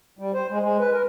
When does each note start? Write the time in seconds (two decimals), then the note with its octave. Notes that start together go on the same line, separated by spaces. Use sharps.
0.19 G3
0.34 C5
0.50 G#3
0.61 G#3
0.79 B4
0.93 A#4